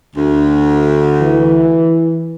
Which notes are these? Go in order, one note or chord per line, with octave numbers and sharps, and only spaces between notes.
D2
E3